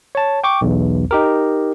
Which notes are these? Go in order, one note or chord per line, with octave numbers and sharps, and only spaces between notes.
C#5 A5
G5 C#6 D6
B1 E2
D#4 G4 A#4